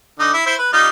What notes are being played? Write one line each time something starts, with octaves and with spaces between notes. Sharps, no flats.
D3 D#4
E4
E4 C5
B4
G3 D#4 F4